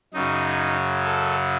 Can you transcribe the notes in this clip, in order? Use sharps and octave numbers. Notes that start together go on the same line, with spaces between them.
F#2 C#3 F#3 D#4
A4